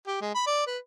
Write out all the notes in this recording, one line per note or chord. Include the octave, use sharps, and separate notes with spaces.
G4
G#3
B5
D5
B4